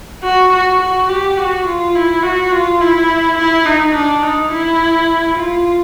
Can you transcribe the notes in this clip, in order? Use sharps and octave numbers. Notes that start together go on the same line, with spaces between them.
F#4
F#4
F#4
G4
F#4
F4
E4
F#4
F4
E4
E4
D#4
D4
D#4
E4
F4